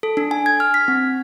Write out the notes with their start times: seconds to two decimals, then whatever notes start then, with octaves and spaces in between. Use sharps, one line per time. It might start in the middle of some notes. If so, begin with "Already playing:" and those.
0.03 A4
0.17 D4
0.31 G#5
0.46 G#6
0.60 F6
0.74 B6
0.88 C4